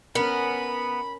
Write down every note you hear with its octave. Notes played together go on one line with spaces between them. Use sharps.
B3 C#4 A#4 B5